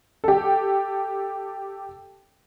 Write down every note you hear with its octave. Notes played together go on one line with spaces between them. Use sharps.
G4 A4